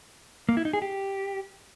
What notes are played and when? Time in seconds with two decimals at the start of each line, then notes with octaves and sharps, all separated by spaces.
0.49 A#3
0.57 E4
0.65 D#4
0.73 G#4
0.82 G4